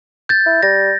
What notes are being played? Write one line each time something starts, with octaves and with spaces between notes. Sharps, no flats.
G6 A6
E4
G3 A#6